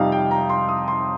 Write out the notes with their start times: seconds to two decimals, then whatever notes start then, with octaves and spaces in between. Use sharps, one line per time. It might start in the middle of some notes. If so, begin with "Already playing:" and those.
Already playing: F2 C3 G3 D#4 F5
0.12 G5
0.31 A#5
0.49 C6
0.69 D#6
0.88 C6